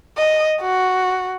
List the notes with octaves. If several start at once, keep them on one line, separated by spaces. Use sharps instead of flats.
D#5
F#4